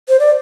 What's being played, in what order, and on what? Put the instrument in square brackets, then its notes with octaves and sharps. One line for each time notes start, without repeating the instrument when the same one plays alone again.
[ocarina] C5
D5